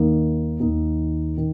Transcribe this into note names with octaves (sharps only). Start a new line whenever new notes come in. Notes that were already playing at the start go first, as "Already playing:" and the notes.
Already playing: D#2 D#3 A#3 D#4
D#2 D#3 A#3 D#4
D#3